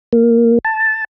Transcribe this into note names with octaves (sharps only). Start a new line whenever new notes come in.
A#3
A5